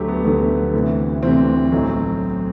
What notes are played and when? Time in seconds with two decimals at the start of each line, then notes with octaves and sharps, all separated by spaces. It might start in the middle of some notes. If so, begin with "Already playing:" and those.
Already playing: D2 D3 F#3 A3 G4
0.08 B3
0.24 D2 D3 F#3 B3
0.74 D2 C3 E3
1.23 D2 C3 E3 C4
1.72 B1 A2 F#3